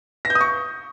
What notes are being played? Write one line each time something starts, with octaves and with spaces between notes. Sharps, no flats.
A#6
G6
D#6
C#6